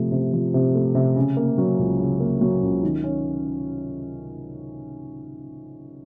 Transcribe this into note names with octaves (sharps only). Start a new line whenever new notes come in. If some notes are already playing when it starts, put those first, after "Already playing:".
Already playing: C3 F3 A3
C3
F3
C3
A3
C3
C#3
A#3
F#3
C#2
C#3
A#3
F#3
C#2
D#3
C#4